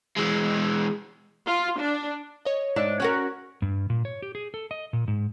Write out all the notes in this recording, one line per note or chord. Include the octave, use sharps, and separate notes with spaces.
E3 G#3
F4
D4
C#5 D#5
G#2 D4 E5
C#4 F#4 A#4 F#6
G2
A#2
C#5
G4
G#4
A4
D#5
A#2
G#2